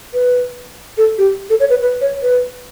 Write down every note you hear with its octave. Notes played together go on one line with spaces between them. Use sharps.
B4
A4
G4
A4
C#5
B4
B4
C#5
B4